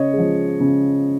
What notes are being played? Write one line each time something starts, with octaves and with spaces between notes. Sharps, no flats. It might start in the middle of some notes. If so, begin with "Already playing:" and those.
Already playing: C#3 C#5 D#5
F3 G#3
C#3